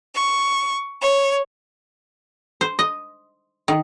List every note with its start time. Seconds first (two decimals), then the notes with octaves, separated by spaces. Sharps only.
0.15 C#6
1.01 C#5
2.61 C5
2.79 D#5
3.68 D#3